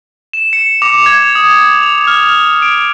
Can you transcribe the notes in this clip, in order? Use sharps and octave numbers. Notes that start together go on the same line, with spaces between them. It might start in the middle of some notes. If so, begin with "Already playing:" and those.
E7
C#7
D6
G#6
D#6
F7
F6
D7